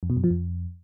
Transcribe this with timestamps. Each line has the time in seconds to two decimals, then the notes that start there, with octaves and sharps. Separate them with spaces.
0.03 F2
0.10 B2
0.17 F#2
0.24 F3
0.31 F2